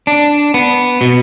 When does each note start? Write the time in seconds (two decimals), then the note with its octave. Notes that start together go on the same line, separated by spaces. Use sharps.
0.07 D4
0.54 B3
1.01 B2